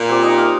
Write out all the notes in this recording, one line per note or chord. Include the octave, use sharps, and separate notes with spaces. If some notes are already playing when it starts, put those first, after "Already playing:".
Already playing: A#2
C4 G4
D#4
A#4 F5